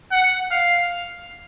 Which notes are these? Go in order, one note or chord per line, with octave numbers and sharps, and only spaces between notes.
F#5
F5